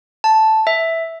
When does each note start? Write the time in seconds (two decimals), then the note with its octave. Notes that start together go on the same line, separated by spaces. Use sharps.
0.24 A5
0.67 E5